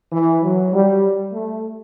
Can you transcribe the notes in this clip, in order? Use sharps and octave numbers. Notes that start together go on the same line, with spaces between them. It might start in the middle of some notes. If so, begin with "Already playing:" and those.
E3
F#3
G3
A3